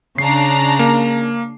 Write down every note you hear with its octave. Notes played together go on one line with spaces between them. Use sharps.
C#3 D4 A#5 C7
A#3